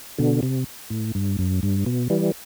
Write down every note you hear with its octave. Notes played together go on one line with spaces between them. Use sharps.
B2 D3
C3
A2
G2
F#2
G2
B2
E3 G3